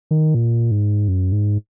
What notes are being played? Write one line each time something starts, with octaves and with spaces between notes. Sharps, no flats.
D#3
A#2
G#2
F#2
G#2